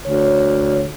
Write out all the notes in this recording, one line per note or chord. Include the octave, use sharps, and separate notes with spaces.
D2 C#5